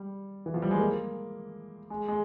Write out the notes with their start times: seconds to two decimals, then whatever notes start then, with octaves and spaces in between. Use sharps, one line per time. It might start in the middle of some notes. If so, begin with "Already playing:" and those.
Already playing: G3
0.46 E3
0.54 F3
0.62 G3
0.71 G#3
0.79 A#3
1.90 G#3
2.08 G#3